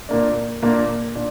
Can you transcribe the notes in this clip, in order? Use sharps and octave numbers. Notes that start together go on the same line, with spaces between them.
A#2 A#3 D4
A#2 A#3 D4
A#2 D4